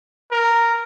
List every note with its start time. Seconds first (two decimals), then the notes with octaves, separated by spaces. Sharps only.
0.31 A#4